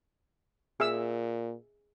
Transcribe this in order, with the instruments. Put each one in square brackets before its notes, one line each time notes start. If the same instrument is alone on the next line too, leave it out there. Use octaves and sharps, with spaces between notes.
[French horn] A#2 [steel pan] G#4 E5 E6